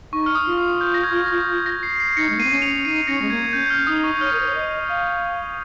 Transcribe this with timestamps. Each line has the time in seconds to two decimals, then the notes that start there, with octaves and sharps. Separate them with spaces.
0.13 D#4 C#6
0.26 F6
0.35 D#6
0.46 F4
0.58 F6
0.81 G6
0.94 A#6
1.03 G#6
1.26 A#6
1.49 G#6
1.66 A#6
1.83 C7
2.00 C7
2.17 D#4 A#6 C#7
2.30 G#3
2.37 A#3
2.39 C7 D#7
2.44 C4
2.51 C#4
2.62 C#7 F7
2.85 D#4 C7 D#7
3.07 C#4 A#6 C#7
3.22 G#3
3.30 A#3 G#6
3.53 C#4 G6
3.66 G6
3.70 F6
3.87 D#4 D#6
4.04 C#6
4.21 C#5 F6
4.33 A#4
4.40 C5
4.48 C#5
4.55 D#5
4.89 F5